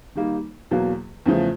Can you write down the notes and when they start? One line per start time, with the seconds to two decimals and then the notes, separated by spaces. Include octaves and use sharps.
0.15 D#3 G3 A#3 D#4
0.71 E2 B2 F#3 A#3
1.26 E2 C#3 F3 A3